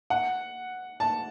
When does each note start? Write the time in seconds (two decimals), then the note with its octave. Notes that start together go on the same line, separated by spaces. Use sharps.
0.10 F#5
1.00 A5